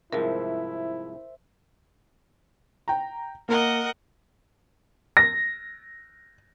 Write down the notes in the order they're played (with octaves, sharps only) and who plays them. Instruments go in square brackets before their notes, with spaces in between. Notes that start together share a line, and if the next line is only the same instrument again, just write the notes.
[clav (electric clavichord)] C2 G#2 F3 [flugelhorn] E4 [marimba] A#4 [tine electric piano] C5 E5
[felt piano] G5 A#5
[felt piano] A#3 [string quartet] A#4 D#5 F#5
[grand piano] A#6